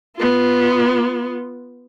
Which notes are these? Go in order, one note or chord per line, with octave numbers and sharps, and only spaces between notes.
B3 F4